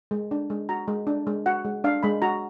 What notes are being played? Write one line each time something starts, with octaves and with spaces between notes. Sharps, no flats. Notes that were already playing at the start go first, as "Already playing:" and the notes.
G#3
D4
G#3
F#4 A#5
G#3
D4
G#3
F#4 F#5
G#3
D4 F5
G#3 B5
F#4 A#5